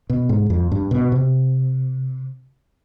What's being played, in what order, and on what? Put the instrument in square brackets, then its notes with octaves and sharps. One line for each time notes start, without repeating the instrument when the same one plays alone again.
[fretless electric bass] B2
G#2
F2
G2
B2
C3